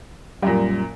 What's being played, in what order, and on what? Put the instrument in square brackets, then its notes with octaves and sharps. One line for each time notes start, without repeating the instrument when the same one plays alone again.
[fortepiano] F#2 A#2 [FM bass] G3